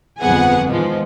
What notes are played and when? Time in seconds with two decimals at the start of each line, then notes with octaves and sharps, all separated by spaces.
0.20 G1 F2 B3 G#4 F#5 G#5
0.69 E2 G#2 D#3 F3 G#3 B3